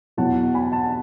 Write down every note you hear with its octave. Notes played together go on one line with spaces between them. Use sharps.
E2 B2 F#3 F#5 A5
G#5 B5
F#5 A5
A5